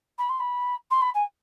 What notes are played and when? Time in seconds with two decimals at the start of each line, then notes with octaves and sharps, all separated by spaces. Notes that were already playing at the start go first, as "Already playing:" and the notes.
0.18 B5
0.29 C6
0.39 B5
0.90 C6
1.01 B5
1.14 G#5